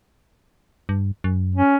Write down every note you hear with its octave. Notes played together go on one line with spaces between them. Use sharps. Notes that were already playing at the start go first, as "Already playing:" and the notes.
G2
F#2
C#4